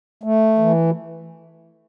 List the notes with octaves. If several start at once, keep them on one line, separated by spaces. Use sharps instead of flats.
A3
E3